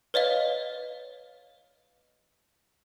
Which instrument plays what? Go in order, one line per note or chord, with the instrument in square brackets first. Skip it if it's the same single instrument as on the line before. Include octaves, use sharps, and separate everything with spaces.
[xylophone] B4 C#5 D#5 F5